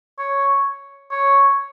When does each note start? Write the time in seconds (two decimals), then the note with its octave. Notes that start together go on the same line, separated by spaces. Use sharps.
0.19 C#5
1.11 C#5